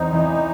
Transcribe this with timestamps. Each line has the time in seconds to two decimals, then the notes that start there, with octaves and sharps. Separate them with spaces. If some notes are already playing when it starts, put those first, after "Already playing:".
Already playing: E2 C4 D#4
0.13 E3